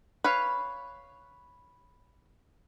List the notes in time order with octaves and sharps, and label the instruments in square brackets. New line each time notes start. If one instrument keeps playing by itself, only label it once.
[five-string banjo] B4 C#5 F5